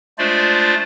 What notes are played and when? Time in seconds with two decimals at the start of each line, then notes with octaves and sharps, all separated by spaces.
0.18 G#3 A3 D4 F4 C5 D5